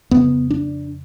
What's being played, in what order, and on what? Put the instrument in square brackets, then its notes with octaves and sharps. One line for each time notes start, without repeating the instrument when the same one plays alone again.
[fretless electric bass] F2 C#3 B3
D4